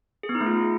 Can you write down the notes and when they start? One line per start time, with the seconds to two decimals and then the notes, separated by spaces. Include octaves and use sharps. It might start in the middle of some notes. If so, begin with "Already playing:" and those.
0.23 G#4
0.29 B3
0.35 D#4
0.41 A3
0.46 F4